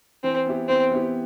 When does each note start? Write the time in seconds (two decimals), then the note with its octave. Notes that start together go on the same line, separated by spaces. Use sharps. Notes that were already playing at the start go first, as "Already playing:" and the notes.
0.23 E3 C4
0.46 B3 E4 G4
0.68 E3 C4
0.91 B3 E4 G4